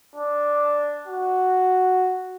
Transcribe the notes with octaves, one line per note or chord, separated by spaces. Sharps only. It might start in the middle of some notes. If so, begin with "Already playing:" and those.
D4
F#4